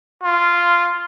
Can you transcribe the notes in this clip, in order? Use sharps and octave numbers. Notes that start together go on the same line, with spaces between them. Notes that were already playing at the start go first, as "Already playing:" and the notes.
F4